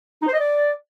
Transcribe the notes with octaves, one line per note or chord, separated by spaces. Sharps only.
D#4
C5
D#5
D5